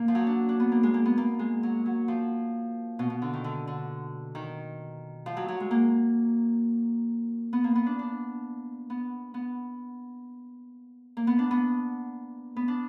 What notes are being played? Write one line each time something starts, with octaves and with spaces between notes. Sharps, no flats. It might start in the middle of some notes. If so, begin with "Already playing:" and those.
Already playing: A#3
F3
F#3
D4
D4
B3
A#3
G#3
A#3
B3
A#3
G#3
F#3
F#3
F3
B2
B2
D3
D#3
D3
D3
D#3
F3
F#3
F#3
G#3
A#3
B3
A#3
B3
D4
D4
B3
B3
A#3
B3
D4
B3
B3
D4